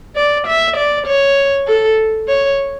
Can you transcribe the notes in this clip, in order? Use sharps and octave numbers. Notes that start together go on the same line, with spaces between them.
D5
E5
D5
C#5
A4
C#5